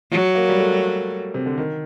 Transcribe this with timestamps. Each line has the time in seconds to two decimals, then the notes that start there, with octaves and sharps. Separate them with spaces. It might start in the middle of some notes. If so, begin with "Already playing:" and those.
0.11 F#3
0.35 A#3
0.49 G3
0.60 A3
1.34 C3
1.46 D3
1.58 D#3